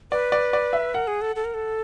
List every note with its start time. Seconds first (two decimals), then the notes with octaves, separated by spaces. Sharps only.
0.12 B4 D5
0.32 D5
0.53 D5
0.73 E5
0.94 A#4 F#5
1.07 G#4
1.21 A4
1.36 A4
1.44 A#4
1.54 A4